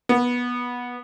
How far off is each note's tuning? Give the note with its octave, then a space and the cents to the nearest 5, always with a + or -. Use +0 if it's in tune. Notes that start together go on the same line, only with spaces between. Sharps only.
B3 -15